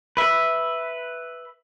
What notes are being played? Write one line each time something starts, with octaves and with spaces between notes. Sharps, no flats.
B4 E5